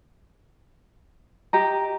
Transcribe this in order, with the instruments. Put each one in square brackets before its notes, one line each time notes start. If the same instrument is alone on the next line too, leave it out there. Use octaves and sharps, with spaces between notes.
[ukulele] G4 D#5 [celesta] A#5